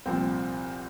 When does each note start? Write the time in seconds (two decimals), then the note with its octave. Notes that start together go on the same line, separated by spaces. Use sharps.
0.06 C2 A#2 F3 C4